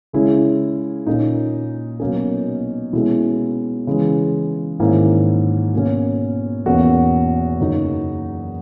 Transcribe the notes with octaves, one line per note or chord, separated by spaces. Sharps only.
C#3 G#3 C#4 E4
A#2 A#3 C#4 D#4
B2 F#3 A#3 C#4
B2 G#3 C#4 E4
C#3 E3 G#3
G#2 D#3 A#3 C#4 E4
B2 A#3 C#4
E2 B2 A#3 C#4 F#4
F#2 C#3 F#3 A#3 D#4